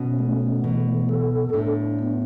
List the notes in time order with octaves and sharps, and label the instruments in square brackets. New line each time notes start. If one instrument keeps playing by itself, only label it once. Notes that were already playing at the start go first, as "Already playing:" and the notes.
Already playing: [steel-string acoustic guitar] B2 [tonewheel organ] C#4
[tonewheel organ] A3
[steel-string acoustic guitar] B2 [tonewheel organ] E3
[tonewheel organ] A4
[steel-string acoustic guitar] B2
[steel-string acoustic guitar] A2 [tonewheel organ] D4
[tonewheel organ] B3